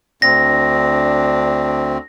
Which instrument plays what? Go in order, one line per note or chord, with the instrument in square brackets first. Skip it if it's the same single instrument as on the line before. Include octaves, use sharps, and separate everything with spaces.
[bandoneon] D2 C4 [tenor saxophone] D4 [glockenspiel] A#6